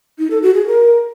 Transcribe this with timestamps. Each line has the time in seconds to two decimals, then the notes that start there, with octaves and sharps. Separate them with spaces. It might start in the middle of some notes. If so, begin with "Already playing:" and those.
0.19 D#4
0.31 A4
0.42 F#4
0.54 G#4
0.66 A#4